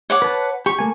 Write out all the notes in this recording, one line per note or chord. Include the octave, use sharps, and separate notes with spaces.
C#5 F#5 D6
B4 A5
G4 C#6
A3 A#3 G#5